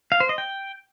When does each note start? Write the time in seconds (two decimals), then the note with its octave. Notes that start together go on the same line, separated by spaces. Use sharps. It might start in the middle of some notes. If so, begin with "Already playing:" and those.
0.12 F5
0.20 C5
0.29 D#5
0.38 G5